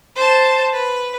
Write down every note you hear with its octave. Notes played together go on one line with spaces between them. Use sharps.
C5 A5
B4